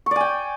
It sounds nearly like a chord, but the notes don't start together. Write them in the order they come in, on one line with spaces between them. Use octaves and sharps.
C#6 D5 G#5 G5